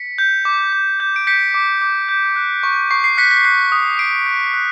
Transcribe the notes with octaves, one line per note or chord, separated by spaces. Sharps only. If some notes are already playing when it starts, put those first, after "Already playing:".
Already playing: B6 C#7
G6
D6
D6
G6
D7
G6 B6 C#7
D6
D6
G6
F#6
C#6
C#6 C7
C7
F#6 B6 C#7
B6
F#6 C7
D#6
D#6 C7 D7
F#6
F#6